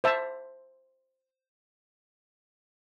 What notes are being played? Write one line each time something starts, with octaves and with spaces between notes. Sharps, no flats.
C5 E5 A5